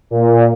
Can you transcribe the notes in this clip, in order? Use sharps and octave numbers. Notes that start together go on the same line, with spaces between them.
A#2